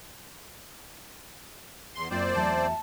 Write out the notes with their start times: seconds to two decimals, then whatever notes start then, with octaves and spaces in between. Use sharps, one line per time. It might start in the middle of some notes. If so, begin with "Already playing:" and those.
1.95 E2 C6
2.11 F#2 A#3 C4 F4 C5 D5
2.36 E2 F#3 A3 A5